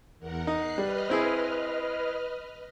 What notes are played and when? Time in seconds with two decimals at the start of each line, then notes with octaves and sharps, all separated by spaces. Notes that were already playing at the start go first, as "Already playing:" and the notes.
0.19 E2 A#4 F#5
0.47 D#4 F#6 C7
0.78 G3 B4 D#5 F6
1.10 C4 E4 G#4